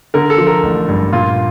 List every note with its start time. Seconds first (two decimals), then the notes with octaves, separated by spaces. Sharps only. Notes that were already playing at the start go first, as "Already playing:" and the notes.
0.14 D3 A#4
0.30 A4
0.38 F3
0.47 A#4
0.63 A1
0.89 G2
1.12 A#2 F4